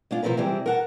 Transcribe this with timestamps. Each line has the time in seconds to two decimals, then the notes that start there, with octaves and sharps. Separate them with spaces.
0.11 G#3 D4 F4
0.23 C3 F3 C4 E4 A#4 B4
0.37 C3 E3 G3 G#3 C4
0.66 A#4 F#5 A5